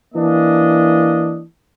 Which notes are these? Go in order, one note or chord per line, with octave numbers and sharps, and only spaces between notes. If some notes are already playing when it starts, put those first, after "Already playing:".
E3 A#3 D4 D#5